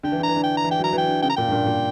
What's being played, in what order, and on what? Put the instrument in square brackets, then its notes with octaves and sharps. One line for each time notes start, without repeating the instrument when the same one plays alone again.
[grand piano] D3 [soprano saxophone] G5
[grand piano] E3
D3
[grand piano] E3 [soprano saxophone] A#5
[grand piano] D3
[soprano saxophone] G5
A#5
[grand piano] E3
[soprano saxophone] G5
[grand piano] F#3
[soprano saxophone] A#5
[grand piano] E3
[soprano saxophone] G5
[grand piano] D3
[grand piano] C#3 [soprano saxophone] G5
[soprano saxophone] A#5
[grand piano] A#2 [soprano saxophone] G5
[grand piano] G2
A#2
A#2